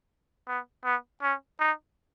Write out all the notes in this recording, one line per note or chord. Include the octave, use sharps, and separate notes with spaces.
B3
B3
C#4
D#4